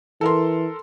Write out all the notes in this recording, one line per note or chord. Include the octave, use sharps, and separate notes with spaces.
E3 A4 A#4 C6